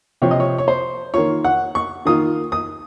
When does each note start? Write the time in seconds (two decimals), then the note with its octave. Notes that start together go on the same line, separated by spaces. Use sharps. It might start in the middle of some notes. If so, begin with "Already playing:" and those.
0.22 C3 F3 C4 F4 C#5
0.31 D#5
0.40 C#5
0.58 C#5
0.68 C5
1.14 D#3 A#3 F4 C#5
1.45 F#5
1.75 C#6
2.05 D#3 A#3 F4 D#6
2.52 D#6